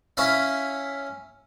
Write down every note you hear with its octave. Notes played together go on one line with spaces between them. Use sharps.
C#4 E4 E5 F5